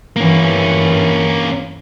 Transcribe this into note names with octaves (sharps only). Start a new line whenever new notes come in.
G2 E3 A#3 C#4